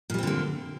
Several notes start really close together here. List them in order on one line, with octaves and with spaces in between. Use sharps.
A#2 G3 C4 D3 A#3